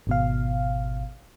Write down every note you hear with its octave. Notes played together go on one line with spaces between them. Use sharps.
G#1 B2 F5